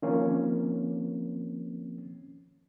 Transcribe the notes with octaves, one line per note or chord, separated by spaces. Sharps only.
D#3 F3 A#3 C4 C#4